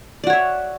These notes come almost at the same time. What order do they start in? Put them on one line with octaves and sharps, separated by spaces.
D5 F#4 C#5 E5